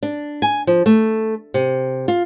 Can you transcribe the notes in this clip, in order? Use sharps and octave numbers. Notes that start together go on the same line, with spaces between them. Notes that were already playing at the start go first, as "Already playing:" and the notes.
D4
G#5
F3
A3
C3
F4